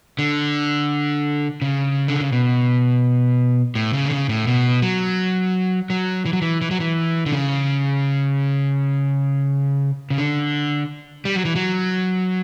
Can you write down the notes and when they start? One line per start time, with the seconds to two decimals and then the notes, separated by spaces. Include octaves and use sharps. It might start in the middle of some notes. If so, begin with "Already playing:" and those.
0.19 D3
1.62 C#3
2.08 D3
2.21 C#3
2.32 B2
3.75 A2
3.93 C#3
4.06 D3
4.12 C#3
4.29 A2
4.47 B2
4.82 F#3
5.90 F#3
6.26 E3
6.33 F#3
6.42 E3
6.62 E3
6.71 F#3
6.80 E3
7.26 D3
7.33 C#3
10.10 C#3
10.18 D3
11.25 G3
11.35 F#3
11.45 E3
11.56 F#3